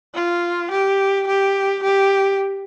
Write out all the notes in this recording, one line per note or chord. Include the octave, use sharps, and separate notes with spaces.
F4
G4
G4
G4